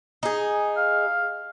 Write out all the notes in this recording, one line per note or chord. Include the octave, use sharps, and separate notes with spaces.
D#4 G#4
F5